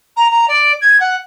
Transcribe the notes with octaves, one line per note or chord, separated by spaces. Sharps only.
A#5
A#5
D5
G#6
F#5